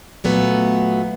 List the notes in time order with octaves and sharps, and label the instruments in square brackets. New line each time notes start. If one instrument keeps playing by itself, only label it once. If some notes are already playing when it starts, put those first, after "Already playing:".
[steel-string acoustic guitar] A#2 F#3 A3 B3